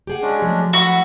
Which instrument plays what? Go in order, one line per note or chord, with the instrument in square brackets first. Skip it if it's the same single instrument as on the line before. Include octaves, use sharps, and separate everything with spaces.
[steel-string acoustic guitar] G4 G#4 F#5
[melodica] G#3 C#4 D4
[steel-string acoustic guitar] F3 F#3 A3
[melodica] E4 E5 [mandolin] F#4